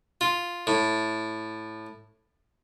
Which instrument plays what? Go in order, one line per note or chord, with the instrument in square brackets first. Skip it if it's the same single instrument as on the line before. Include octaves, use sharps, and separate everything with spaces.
[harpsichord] F4
A2